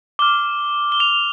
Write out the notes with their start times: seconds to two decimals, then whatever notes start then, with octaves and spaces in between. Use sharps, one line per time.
0.19 D6 F6 G7
0.92 G7
1.00 F7